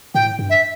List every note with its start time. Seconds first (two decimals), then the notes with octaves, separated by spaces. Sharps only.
0.15 A2 G5
0.39 G2
0.50 E5